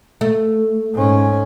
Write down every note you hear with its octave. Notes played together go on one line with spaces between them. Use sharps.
A3
G#2 C#4